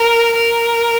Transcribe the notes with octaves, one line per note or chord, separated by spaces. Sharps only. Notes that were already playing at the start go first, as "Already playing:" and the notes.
Already playing: A#4
A#4